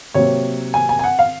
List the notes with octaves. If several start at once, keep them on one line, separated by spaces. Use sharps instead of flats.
C3 F#3 A#3 C#5
G#5
G#5
G#5
F#5
F5